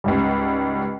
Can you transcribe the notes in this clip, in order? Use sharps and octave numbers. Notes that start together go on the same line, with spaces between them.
C#2 G#2 G3